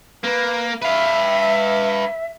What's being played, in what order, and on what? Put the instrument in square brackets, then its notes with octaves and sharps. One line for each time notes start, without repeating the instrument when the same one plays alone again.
[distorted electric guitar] A#3 [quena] B4
[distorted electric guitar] B4 F5 [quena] E5